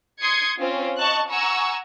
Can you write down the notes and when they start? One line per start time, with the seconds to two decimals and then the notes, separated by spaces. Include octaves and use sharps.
0.21 C6 D#6 G#6 C7 C#7
0.59 C4 C#4 F4
0.99 D#5 A5 C#6 F#6
1.30 F#5 G#5 A#5 C#6 E6